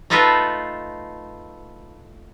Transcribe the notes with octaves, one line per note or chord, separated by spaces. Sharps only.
A3 D#4 F4 A4 B4 E5